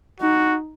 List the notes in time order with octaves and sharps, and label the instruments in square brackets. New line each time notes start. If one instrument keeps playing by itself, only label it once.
[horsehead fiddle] D#4 [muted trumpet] F#4